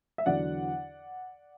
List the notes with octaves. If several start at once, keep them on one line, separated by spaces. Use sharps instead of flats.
E5
E2 D3 F#3 D5 F#5